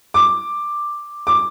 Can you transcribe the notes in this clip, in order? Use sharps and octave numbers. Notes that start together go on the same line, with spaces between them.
D6
D6